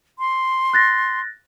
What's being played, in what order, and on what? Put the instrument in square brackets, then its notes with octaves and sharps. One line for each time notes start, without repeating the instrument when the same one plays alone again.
[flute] C6
[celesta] F#6 A6 A#6